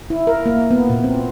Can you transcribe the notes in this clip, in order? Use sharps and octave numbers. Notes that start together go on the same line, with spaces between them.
E4
A#4
A#3
B3
A#2
C4